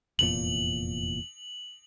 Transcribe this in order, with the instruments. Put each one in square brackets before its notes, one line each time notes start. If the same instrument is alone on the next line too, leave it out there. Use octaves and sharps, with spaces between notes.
[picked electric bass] F1 E2 A#2 [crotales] F#7